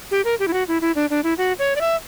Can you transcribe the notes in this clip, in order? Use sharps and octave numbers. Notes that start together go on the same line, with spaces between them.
G4
A#4
G4
E4
F#4
E4
E4
D4
D4
E4
F#4
C#5
D5
E5